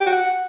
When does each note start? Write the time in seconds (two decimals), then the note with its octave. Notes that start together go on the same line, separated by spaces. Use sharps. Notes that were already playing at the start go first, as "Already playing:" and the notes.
0.01 G4
0.07 F#4
0.13 F#5